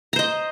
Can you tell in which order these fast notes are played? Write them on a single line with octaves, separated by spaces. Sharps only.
A#5 C5 D#5